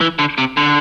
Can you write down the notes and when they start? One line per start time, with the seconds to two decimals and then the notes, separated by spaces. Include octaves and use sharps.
0.01 E3
0.19 D3
0.38 C3
0.57 D3